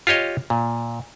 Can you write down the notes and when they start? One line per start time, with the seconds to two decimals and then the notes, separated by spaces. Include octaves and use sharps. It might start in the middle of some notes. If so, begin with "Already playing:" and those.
0.07 F4 G4 C#5 D#5
0.50 A#2